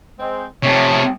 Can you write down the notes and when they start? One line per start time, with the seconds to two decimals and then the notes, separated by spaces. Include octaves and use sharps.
0.19 G#3 C4
0.63 C3 A3 C#5